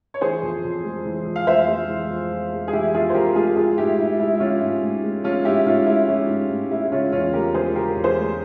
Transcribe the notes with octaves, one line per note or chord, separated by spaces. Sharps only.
C#5
E3 G#4 C5
F2
F2
G#3
E3
F2
F5
F2 C5 E5
G#3
E3
F2
F2
G#3
G#4
E3 E4 G4
F2 F4 G#4
C5
F2 G4 A#4
G#3 F4 G#4
F3 F4 G#4
G#2 E4 G4
G#2 E4
G#3 E4
E4
F3 C#4 F4
G#2
G#2
G#3
F3 C#4 F4
G#2 E4 G4
G#2 C#4 F4
G#3 E4
F3 C#4
G#2
G#2
G#3 E4
C#3 C#4 F4
E2 C#4 F4
G#3 G4 A#4
F3 G#4 C5
C#3 G4 A#4
E2
G#4 C5
G#3